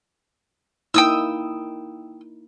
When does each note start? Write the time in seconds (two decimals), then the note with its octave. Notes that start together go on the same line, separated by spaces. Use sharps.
0.94 A#3 D#4 E4 G5 D#6 E6